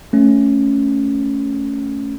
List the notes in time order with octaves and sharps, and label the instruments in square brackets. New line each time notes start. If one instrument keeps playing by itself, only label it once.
[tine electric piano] A3 C#4